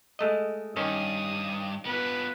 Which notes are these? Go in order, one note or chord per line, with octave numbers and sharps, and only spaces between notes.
G#3 A3 D#5
G2 D#3 C#4 D#6
B3 F4 B4